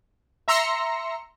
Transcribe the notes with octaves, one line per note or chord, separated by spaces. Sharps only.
E5 A#5 C6 E6 A#6 C#7